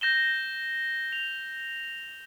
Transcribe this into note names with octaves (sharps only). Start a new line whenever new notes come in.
G6 A#6 E7 G7
F7